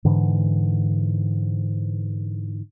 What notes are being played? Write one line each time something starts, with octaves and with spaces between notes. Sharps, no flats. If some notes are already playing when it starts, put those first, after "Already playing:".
G#2 D3 E3